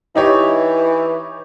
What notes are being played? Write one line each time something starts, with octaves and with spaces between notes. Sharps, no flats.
E3 D#4 G4 C#5